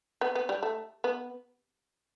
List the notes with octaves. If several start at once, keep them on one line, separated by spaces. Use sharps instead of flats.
B3
B3
G3
A3
B3